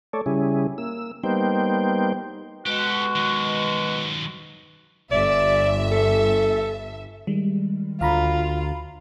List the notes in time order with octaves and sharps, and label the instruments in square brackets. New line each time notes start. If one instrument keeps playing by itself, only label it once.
[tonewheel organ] A3 A4 C#5 D5
C#3 G3 C#4 E4 G#4
A#3 E6
G3 A#3 B3 D#4 C5 G5
[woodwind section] B2 G#3 F#4 [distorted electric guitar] G4 A4
[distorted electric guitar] D#3 F#3
[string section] G1 E5 [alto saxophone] D5
[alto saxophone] A4
[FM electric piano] D#3 G3 G#3
[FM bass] D2 [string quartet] F4 [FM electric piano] F5 A#5 B5